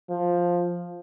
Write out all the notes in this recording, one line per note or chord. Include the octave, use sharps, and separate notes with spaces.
F3